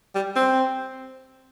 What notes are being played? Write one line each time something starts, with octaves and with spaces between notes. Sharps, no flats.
G3
C4